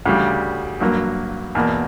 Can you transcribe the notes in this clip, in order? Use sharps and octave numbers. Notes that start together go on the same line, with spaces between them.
D2 C#3 G3
G2 F#3 A#3
E2 B2 A#3